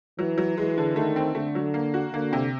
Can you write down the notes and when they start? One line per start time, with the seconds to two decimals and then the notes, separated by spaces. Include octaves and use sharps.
0.19 E3 F#3
0.38 F#3
0.58 E3 G#3
0.78 D3
0.96 D#3 A3
1.16 C4
1.35 D3 A3
1.55 F#3
1.74 A#3
1.94 F#4
2.13 D3 A#3
2.33 C3